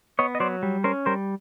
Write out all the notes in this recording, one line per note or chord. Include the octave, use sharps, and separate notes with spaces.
B3 C#5 D#5
D#5
F#3 C5 D5
G3
C#4 A#4 C5
G3 A#4 C5